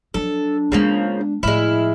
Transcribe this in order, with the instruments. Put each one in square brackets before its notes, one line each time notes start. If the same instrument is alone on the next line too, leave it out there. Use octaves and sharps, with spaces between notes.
[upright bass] F3 F#3 [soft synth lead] D4 [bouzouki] A4
[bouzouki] C#3 F3 A#3 [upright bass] G#3 B3
[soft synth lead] D4
[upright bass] A2 F3 [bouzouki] G#3 E4 [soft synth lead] F6